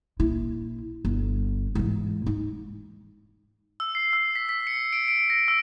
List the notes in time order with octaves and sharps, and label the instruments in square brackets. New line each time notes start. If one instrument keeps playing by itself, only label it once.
[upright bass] A#1 E4
G1
G#2 E3
G#3 D#4
[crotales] E6
C7
E6
B6
B6
C#7
D7
D7
A#6
E6